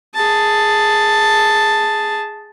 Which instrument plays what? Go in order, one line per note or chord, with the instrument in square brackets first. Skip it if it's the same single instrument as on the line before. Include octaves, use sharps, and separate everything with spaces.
[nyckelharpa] G#4 A5